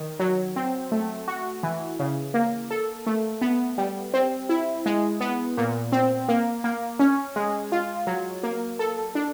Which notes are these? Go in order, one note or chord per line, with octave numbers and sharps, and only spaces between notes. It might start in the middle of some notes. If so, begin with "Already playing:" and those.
Already playing: D#3
F#3
C4
A3
F#4
E3
C#3
A#3
A4
A3
B3
G3
C4
E4
G#3
B3
A#2
C4
A#3
A#3
C#4
G#3
F4
F#3
A#3
A4
D4